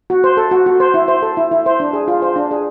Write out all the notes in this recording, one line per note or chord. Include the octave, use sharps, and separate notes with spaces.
F#4
C5
A4
F#4
F#4
C5
E4
C5
A4
E4
E4
C5
D4
G#4
F4
C5
D4
G#4